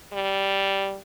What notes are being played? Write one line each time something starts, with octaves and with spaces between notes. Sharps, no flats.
G3